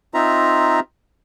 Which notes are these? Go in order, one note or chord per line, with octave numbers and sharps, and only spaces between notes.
C4 D#4 F4 E5 A#5